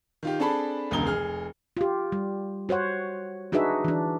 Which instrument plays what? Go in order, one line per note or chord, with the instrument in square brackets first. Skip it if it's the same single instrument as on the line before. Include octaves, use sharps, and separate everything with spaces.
[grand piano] D#3 F4 G4
C4 D4 G#4 A4 A5 B5
E1 C#2 B2 D3 A#4 G7
F1 G#4 F6
[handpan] F4 G4
G3
F#4 C5 C#5 F#5
D4 D#4 F#4 G#4 B4 E5
E3 D4